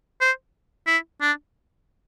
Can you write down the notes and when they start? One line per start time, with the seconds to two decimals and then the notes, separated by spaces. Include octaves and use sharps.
0.21 C5
0.87 E4
1.21 D4